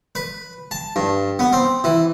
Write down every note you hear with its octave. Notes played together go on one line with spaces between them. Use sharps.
B4
A5
G2
B3
C4
E3